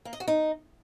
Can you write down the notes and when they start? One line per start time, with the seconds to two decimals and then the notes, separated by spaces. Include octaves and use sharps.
0.05 A#3
0.13 D#5
0.20 F#4
0.28 D#4